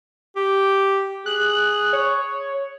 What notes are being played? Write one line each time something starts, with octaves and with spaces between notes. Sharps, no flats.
G4
G#4 F#6
C#5